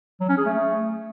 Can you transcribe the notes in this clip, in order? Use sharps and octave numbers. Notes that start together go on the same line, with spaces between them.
F#3
C#4
G#4
A3